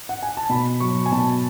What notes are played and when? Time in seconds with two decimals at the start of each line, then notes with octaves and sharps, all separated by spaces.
0.09 F#5
0.23 G#5
0.37 A5
0.49 B2 B5
0.80 F#3 C#6
1.06 G#5
1.12 B2 A5